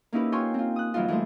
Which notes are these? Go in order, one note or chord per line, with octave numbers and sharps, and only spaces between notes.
A#3 C#4 D#4 E4 G4 B4
F4 C#5 G5 G#5 C6 C#6
C4 F4
D#6 F#6
F#2 E3 F#3 G3 D#4 F4
E3 G3 A3 C5